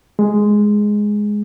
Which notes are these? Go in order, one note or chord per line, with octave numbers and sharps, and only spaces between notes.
G#3